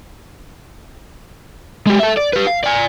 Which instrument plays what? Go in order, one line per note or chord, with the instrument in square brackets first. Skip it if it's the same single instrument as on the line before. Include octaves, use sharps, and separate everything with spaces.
[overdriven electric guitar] G#3 G4
A4 E5
D5
G4 B4
F5
D5 G#5